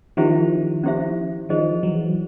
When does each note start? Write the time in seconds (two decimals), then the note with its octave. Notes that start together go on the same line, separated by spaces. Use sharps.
0.17 D#3 F3 C#4 E4 G4 C5 E5
0.83 C#4 E4 G4 C5 E5
1.49 D#3 F3 G#4 C5 D#5
1.83 E3 F#3